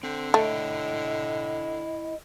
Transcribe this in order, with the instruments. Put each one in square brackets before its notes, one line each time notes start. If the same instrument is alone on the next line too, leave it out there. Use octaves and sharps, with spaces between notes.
[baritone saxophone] D3 [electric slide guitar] C4
[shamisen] A3 [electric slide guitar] E4 C#5 G5 [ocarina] D#5